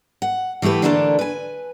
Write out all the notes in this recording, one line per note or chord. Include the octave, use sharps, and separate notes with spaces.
F#5
E3 A3 E4 G4 B4
D3 E3 A3 A#3 D4 A4
B4 G#5